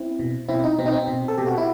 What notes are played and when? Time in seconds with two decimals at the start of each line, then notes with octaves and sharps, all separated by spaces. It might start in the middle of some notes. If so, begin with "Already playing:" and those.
Already playing: C4 E4
0.19 B2
0.48 B2 C4 E4
0.64 D#4
0.78 B2 C4
0.86 D#4
0.92 C4
1.07 B2
1.28 A4
1.38 B2 G4
1.47 F#4
1.57 E4